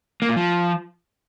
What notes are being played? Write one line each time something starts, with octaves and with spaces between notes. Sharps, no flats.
A#3
A#2
F3